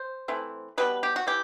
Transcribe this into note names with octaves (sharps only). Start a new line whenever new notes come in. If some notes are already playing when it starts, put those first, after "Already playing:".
Already playing: C5
E3 A3 C4
B2 G3 B3 B4
G4
F#4
E3 G4